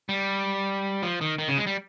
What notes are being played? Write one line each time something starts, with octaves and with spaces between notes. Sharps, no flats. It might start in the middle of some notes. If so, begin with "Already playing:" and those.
G3
F3
D#3
D#3
C#3
G#3
G3